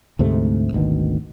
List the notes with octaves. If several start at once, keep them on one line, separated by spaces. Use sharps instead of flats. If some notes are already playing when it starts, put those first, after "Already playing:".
D2 G#2 C3 A3
G#1 D2 B2 D#3